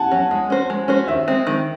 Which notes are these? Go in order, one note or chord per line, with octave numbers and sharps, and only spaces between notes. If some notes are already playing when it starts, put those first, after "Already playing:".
Already playing: F#5 G#5 A5
F#3 C#4
G#3
C#4 F#4 C5
G#3
C#4 F#4 C5
D#3 E5
G#3 C4
D#3